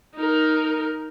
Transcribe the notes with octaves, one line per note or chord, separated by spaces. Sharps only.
D#4 A#4